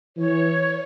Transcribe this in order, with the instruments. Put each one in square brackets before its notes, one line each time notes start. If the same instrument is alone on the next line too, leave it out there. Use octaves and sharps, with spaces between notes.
[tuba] E3 [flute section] C#5